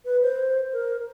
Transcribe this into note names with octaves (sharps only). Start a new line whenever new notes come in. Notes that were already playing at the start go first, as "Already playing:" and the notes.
B4
C5
A#4